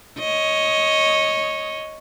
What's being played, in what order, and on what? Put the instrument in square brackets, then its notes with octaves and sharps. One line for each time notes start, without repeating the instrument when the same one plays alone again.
[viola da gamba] C#5 D#5